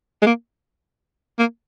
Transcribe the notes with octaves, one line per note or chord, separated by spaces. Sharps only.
G#3
A#3
A#3